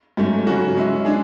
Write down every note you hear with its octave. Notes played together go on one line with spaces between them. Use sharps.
G#2 F#3 A3 C#4
C#3 F#3 C#4 F#4
G#3 C#4 E4
G#3 D4 G#4